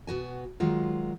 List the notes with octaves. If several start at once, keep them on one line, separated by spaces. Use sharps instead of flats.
B2 B3 F#4 G#5
D#3 F#3 G#3 F4